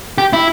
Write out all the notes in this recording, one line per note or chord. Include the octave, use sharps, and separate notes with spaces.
G4
E4